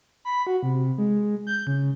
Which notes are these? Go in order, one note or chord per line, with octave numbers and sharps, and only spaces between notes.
B5
F#4
C3
G#3
G6
C#3